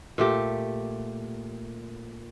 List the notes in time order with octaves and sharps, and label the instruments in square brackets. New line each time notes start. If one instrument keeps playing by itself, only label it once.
[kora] A#2 A3 G4